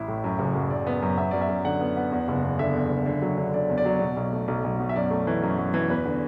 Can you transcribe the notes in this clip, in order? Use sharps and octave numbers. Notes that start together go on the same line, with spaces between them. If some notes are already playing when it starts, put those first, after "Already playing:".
Already playing: A1 E4
A2
F#2
F#1
F#2
F#1 D5
B3
F#2
B3 E5
F#2 D5
E5
F#2
D3 F#5
B3
B3
E2
F#1
E2
D3 E5
E2
F#1
D3
F#3
D3
D3 D5
E2
D5
F#3
B2
B1
A3
B1
B1
B2
E5
F#2 D5
A3
E3
F#2
F#2
E3
E2 B4
D3